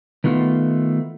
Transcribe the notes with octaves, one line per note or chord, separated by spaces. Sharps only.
D#3 A3 B3 F4